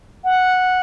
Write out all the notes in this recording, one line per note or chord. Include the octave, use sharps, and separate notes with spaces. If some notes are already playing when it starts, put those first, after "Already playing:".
F#5